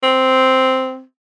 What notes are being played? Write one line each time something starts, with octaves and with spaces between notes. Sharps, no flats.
C4